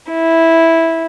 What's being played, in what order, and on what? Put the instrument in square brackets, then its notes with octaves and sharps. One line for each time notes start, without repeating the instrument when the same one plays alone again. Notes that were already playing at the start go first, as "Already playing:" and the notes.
[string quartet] E4